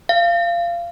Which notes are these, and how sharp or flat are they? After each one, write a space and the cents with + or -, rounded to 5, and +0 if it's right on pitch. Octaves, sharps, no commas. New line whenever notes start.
F5 -20